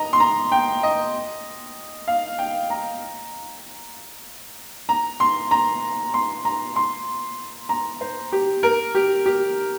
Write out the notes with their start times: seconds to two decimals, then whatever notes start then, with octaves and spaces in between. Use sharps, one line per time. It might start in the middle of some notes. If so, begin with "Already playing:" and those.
Already playing: D#5 A#5
0.13 C6
0.20 A#5
0.52 G5
0.83 D#5
2.08 F5
2.39 G5
2.70 A#5
4.89 A#5
5.20 C6
5.51 A#5
6.14 C6
6.45 A#5
6.76 C6
7.69 A#5
8.01 C5
8.32 G4
8.63 A#4
8.95 G4
9.26 G4